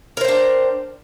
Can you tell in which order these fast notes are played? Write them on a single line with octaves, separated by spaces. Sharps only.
A#4 C5 G5 D4